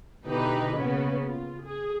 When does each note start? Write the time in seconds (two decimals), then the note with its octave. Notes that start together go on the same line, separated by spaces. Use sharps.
0.25 B2 D3 E3 D#4 G4 B4
0.76 C#3 A#3 B3 C#4
1.25 F4
1.63 G#4